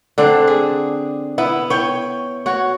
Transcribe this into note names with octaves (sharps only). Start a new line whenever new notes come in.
D3 C4 D4
G#4
B3 E4
C#5 G5
F#4 C#5